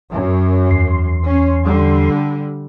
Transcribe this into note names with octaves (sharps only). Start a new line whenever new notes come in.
F#2
E2 C6
C#4
D3 G3